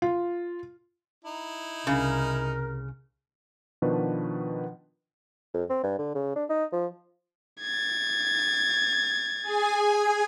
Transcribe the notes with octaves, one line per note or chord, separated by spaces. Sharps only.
F4
D#4 E4
C2 C#3 A#4
B2 D#3 F3 D4 F#4 B4
F2
C4
G2
D3
C#3
D4
D#4
F3
G#6 A6
G#4 G#5